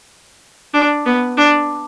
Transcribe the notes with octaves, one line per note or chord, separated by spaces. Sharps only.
D4
B3
D4